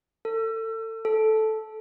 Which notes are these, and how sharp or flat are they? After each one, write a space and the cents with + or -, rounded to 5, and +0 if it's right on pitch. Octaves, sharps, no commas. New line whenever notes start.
A4 +30
A4 -10